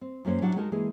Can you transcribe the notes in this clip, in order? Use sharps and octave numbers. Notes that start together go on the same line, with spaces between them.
C4
F#2 F#3 A#3 C#4 C5
A2 F#3 D4 F#4 F#5
G#3 D#4 F#4 A#4 A5
E3 G#3 A#3 G#4